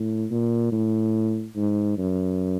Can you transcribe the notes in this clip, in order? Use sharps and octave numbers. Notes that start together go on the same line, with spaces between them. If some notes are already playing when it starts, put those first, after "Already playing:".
Already playing: A2
A#2
A2
G#2
F#2